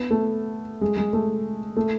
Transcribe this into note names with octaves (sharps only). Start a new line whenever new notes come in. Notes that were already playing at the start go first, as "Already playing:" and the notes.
Already playing: B3
A3
G#3
G#3
A3
A3